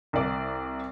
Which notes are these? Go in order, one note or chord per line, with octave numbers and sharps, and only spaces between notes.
C2 D5